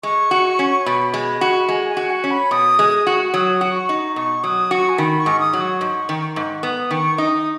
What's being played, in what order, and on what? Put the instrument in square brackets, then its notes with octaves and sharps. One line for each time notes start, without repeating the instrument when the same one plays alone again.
[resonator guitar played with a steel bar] G#3 [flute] C#6
[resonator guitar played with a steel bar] F#4
C#4
[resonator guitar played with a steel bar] B2 [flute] B5
[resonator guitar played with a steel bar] G#3
F#4
[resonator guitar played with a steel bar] G#3 [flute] G#5
[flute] G#5
[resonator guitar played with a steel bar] F#4
[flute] F#5
[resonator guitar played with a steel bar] C#4
[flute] B5
[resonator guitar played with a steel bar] B2 [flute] D#6
[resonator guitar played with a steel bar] G#3
F#4
[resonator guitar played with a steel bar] F#3 [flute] D#6
[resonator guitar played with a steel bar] F#4
[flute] C#6
[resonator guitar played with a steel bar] D#4
[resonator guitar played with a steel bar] B2 [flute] C#6
[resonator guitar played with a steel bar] F#3 [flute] D#6
[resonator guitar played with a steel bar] F#4 [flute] C#6
[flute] G#5
[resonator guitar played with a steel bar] D#3 [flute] B5
[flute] C#6
[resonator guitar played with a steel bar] G#2
[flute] D#6
[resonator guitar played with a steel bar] F#3
[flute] C#6
[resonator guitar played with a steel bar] G#2
D#3
G#2
[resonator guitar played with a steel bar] B3 [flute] D#6
[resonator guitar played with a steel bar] D#3 [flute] C#6
[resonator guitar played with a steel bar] D#4 [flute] D#6